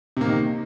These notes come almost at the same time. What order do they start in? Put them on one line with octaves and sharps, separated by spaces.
C3 A#3 D#3